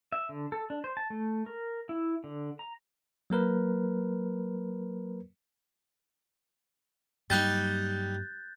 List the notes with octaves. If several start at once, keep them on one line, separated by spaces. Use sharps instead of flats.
E5
D3
A4
D4
C5
A5
A3
A#4
E4
D3
A#5
F#3 A#3 A#4 B4
G2 F#3 G3 A#3 D#4 F#6 G6 A6